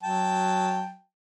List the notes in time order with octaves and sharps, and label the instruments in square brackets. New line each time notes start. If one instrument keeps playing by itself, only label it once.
[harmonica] F#3 G5 A5